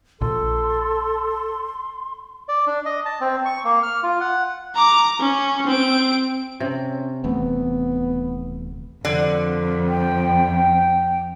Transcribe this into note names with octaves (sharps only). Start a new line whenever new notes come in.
A#1 A4 C6
D5
D4
D#5
A5
C4
C#6
A#3
F6
F4
F#5
A#5 D6
C#4
C4 D7
C3 C#4
D#1 E3 A3 B3
F2 D3
G5